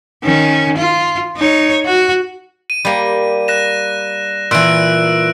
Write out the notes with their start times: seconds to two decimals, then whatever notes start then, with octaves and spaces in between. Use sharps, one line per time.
0.23 D#3 C#4
0.77 F4
1.36 D#4 C#5
1.85 F#4
2.70 D#7
2.85 G3 A#3
3.48 F#6 A#6 E7
4.51 A#2 E3 E6 F#6 D7